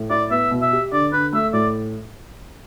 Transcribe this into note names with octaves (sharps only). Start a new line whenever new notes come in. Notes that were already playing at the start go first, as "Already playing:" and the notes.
Already playing: A2
E4 D5
B3 E5
B2
E5
G4
D3 D5
D3 B4
A3 E5
A2 D5